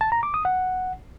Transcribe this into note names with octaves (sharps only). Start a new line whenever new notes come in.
A5
A#5
D6
D#6
F#5